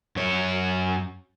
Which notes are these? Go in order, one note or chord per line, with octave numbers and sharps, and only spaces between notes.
F#2 C#5